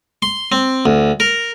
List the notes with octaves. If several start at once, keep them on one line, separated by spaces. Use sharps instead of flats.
C6
C4
D2
A#4